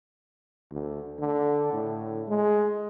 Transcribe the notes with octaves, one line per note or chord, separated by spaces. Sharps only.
D2
D3
A2
G#3